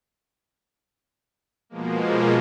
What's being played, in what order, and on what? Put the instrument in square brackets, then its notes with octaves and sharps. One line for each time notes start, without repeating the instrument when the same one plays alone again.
[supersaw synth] B2 F3 G#3 A#3